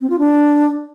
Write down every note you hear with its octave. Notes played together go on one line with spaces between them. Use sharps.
C4
F4
D4